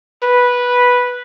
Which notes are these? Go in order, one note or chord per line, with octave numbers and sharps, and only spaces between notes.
B4